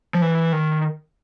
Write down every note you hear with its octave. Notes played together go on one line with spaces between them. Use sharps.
F3
E3
D#3